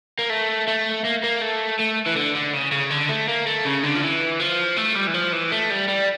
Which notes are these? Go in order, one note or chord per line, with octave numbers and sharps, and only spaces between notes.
A#3
A3
A3
A#3
A#3
A3
A3
E3
D3
D3
C#3
C#3
D3
A3
A#3
A3
C#3
D3
F3
E3
F3
A3
G3
E3
F3
E3
A3
G3
G3